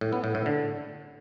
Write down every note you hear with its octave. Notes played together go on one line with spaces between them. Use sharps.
A2
B3
A2
A2
D3